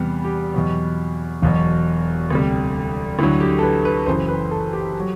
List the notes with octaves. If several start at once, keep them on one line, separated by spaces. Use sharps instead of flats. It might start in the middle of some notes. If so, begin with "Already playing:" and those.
Already playing: E2 C3 G3 B3
G4
E2 B2 F#3
E1 E2 B2 F#3
D2 C3 G3
D2 D3 F#3 E4
G4
A4
B4
B4
F#1 F#2 E3 C5
B4
A4
G4
F#3